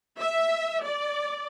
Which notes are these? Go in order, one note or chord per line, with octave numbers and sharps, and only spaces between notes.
E5
D5